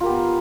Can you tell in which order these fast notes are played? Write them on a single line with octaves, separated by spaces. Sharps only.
F4 A#4 G4 B3